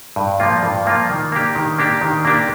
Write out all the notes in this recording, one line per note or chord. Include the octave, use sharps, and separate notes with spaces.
G2
F3 A#3 F4
G2
F3 A#3 F4
D#3
A#3 D4 G4
D#3
A#3 D4 G4
D#3
A#3 D4 G4